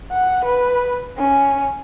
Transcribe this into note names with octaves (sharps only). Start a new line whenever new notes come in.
F#5
B4
C#4